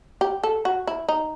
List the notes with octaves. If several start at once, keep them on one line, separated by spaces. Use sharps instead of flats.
G4
A4
F#4
E4
D#4